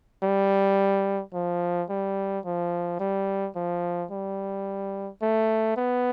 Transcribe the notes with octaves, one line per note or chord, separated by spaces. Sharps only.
G3
F3
G3
F3
G3
F3
G3
A3
B3